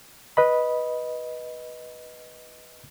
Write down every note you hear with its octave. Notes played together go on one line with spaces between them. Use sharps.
B4 D#5 B5